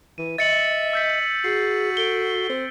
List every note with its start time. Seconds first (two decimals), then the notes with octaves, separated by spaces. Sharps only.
0.18 E3 D#7
0.38 D#5 E5 A6 C#7 F#7
0.93 E6 G6 B6
1.44 F#4 G#4 C7
1.97 A4 D7 G7
2.50 C4